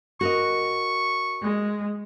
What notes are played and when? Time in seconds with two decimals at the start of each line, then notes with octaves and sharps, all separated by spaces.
0.21 F#4 A#4 D#5 C#6
1.40 G#3